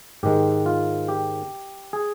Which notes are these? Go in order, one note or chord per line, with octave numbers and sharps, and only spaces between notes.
G#2 D#3 G#3 G4
F4
G4
G#4